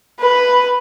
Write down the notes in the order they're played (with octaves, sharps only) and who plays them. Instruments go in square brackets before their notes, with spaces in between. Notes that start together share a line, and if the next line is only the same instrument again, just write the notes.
[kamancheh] B4